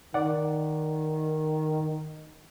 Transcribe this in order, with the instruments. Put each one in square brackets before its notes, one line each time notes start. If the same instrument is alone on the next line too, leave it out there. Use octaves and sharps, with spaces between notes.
[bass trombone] D#3 [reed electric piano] D5 F#5